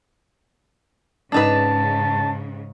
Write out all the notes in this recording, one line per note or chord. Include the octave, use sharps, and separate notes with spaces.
G#2 C#3 D4 D#4 B4 A5